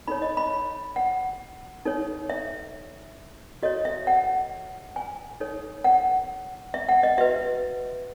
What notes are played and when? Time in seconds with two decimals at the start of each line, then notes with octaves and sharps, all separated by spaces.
0.08 D#4 A4 C#5 B5
0.22 D#5
0.37 B5
0.96 F#5
1.85 D#4 A4 C#5
2.30 E5
3.63 F#4 A4 C#5 D#5
3.85 E5
4.07 F#5
4.96 G#5
5.40 D#4 A4 C#5
5.84 F#5
6.74 E5
6.89 F#5
7.03 D#5
7.18 F#4 B4 E5